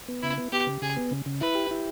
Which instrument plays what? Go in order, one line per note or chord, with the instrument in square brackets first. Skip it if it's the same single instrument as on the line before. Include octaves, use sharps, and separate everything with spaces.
[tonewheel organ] B3
[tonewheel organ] C#3 [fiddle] E4
[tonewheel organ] B3
[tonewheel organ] B3 [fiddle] G4
[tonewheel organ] C#3
[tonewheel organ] C#3 [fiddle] G#4
[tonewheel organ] B3
C#3
C#3
[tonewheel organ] E4 [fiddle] B4
[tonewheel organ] G4
E4